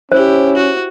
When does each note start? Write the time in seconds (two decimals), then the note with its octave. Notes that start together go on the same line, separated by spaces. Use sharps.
0.12 C#4 E4 G4 C5
0.55 F#4